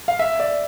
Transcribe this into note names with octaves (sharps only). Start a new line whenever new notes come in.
F5
E5
D5